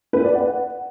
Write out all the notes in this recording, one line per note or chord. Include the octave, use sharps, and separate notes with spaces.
B4
D5
F#5